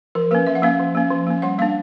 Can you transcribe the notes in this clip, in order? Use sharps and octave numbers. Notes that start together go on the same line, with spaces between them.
F3 A#4
A#3 C#4 B4
F3 E5
F#5
A#3 C#4 F5
F3
A#3 C#4
F3
A#3 C#4
G3 F#5
A#3 D4 F5